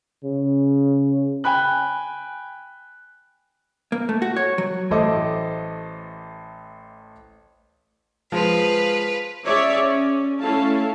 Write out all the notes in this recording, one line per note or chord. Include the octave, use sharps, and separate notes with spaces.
C#3
G5 G#5 B5 F#6
A#3
A3
F#4
C#5
F#3
A1 A3 A4 C5 D#5 D6
F3 G#3 B4 F5
C#4 G#4 C#5 D5 E5
C#4
A3 C#4 E4 A4 F5 A5